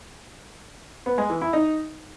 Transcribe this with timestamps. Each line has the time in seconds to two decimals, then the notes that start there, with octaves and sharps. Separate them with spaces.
1.06 B3
1.18 G#3
1.30 E3
1.41 E4
1.53 D#4